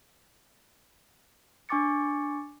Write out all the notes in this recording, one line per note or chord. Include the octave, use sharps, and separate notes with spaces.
D4 G#5 C#6 D6 A6 C#7